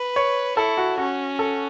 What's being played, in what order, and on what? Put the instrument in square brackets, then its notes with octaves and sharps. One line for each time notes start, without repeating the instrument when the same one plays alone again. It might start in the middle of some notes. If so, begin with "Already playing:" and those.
Already playing: [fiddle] B4
[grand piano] C#5
[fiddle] E4 [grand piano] A4
[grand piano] F#4
[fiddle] C#4 [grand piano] F#4
[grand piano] A4